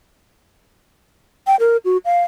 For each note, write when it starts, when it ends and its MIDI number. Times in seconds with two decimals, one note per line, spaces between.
1.47 1.56 79
1.60 1.77 70
1.85 1.97 66
2.05 2.22 77